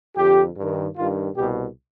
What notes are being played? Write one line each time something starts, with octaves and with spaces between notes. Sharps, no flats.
F2 D3 G4
G2 D#3
G2 D#3 F4
C2 B2 G4